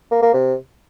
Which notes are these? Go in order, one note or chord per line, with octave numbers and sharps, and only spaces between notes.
A#3
A#3
C3